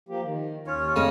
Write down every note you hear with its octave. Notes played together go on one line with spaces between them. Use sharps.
F3 A#3 G4
D#3
D#2 C#4 F4 C#5
F2 C#3 D#5